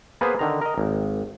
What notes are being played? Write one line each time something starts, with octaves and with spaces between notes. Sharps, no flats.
A#3 B3 G#4 B4 C5
D3 D#3 A#5
A#4 D#5
G#1